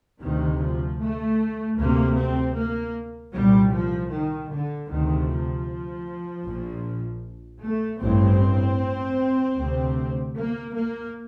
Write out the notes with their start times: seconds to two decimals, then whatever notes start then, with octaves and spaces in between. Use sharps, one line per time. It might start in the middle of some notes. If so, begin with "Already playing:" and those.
0.21 D2 C3 D#3
0.60 F3
0.99 A3
1.77 D2 C3 A#3
2.16 C4
2.55 A#3
3.33 C2 A#2 G3
3.72 F3
4.10 D#3
4.50 D3
4.89 D2 C3 D#3
5.28 F3
6.44 A#1 A#2
7.61 A3
8.01 A1 G2 C4
9.56 D2 C3
10.35 A#3
10.73 A#3